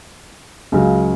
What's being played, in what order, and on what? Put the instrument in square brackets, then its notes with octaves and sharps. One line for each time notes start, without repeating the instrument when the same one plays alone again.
[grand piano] C#2 C#3 F#3